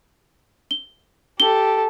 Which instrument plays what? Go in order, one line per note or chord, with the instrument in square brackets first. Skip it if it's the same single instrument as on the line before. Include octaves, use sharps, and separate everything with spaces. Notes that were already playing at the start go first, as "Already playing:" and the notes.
[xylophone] G7
[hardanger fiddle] G4 A4 [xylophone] G7